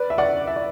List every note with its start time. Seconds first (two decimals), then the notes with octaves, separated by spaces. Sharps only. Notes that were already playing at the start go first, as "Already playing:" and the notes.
Already playing: B4 D5
0.10 E5
0.18 D5 F#5
0.47 E5
0.56 D5